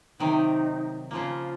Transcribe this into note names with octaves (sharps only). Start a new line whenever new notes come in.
C3 D#3 F#3 D#4
C#3 F3 A#3 F4